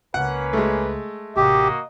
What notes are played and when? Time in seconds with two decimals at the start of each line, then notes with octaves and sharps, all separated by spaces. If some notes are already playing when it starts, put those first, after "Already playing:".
0.14 C#2 A#3 C#4 B4 F#5
0.53 G#3 A3
1.36 A1 C3 A#3 F#4 G4 D#5